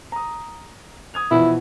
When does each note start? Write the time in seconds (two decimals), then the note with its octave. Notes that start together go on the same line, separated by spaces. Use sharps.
0.12 A#5 D#6
1.14 D#6 G#6 F7
1.31 B2 E3 F3 E4